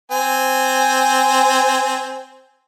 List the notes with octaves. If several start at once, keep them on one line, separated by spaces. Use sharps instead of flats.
C4 G#5